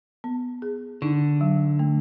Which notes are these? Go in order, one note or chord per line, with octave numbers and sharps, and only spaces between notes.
B3
G#4
D3 D#4
F#3
A3